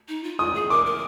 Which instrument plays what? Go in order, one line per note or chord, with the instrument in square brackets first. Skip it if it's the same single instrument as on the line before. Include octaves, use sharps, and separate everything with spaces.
[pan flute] D#4
F4
[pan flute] F4 [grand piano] D#6
[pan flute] G#4
[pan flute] A#4 [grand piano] D6
[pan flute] A#4